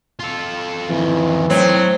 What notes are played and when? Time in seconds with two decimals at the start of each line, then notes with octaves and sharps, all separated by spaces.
0.20 F4 A4
0.89 F2 D#3 E3
1.50 A2 F#3 C4